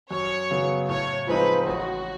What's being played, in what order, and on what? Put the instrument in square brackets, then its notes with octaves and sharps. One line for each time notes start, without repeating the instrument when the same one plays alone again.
[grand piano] F#2 [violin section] C#5
[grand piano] C#3 F#3 B3
[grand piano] A2 [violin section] C#5
[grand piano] F3 G#3 C4 D#4 [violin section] B4
[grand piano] A1 [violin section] F#4